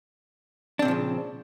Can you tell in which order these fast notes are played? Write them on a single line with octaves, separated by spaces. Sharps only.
D4 C4 A#2 F3 C#3